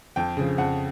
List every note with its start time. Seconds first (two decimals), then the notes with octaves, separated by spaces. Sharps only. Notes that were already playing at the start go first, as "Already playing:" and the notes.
0.16 F2 G5
0.37 C#3 F3
0.58 F2 F#5